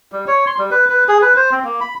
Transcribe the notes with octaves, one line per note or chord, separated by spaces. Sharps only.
G3
C#5
C6
G3
B4
B4
G#4
B4
C5
C4
A#3
B5